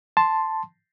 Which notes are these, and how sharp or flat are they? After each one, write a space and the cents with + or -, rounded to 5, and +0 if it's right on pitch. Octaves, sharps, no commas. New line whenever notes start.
A5 +0 C6 +0